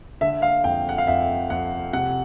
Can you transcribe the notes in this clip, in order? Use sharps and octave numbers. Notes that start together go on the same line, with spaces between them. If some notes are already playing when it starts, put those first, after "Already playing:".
D3 E5
F5
F2 G5
F#5
F5
F2 E5
F2 F#5
C3 F#5